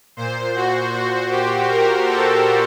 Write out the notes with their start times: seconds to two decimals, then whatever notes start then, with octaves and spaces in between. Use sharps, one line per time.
0.17 A#2 C5
0.55 F#4
0.92 F#4
1.31 G4
1.69 A#4
2.07 A4